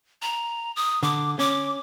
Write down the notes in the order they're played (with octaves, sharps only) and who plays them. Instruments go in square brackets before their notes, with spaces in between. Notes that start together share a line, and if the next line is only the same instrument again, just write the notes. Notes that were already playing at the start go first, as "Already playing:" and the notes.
[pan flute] A#5
D#6
[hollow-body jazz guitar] D3 [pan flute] D6
[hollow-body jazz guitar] C#4 [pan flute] D6